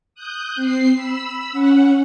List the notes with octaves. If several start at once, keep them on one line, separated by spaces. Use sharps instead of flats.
D#6 F#6 G6
C4 C7
B5 E6
C#4 F#5